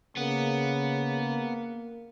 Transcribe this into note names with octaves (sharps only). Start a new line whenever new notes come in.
C#3 A#3 B3